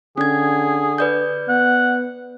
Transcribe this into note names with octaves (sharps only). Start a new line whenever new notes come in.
D3 C#4 G#4 G#6
B4 D5 G6
B3 F#5